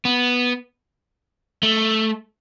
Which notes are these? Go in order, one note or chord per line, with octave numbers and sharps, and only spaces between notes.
B3
A3